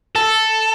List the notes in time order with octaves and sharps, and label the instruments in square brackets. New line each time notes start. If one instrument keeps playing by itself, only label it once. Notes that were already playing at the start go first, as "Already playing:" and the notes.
[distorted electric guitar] A4